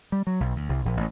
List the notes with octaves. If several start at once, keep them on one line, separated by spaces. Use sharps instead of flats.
G3
F#3
B1
D2
C2
A#1
A1